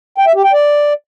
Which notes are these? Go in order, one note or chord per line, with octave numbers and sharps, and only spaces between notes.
G5
E5
G4
G5
D5